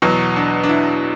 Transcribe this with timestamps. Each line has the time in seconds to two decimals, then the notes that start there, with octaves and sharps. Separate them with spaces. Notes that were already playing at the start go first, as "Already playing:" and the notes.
0.02 E2 B2 F#3
0.36 D4
0.63 D4
0.69 E4